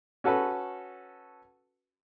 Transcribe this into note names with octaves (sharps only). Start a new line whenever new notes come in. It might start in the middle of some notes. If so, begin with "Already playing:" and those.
C#4 F#4 A4 B4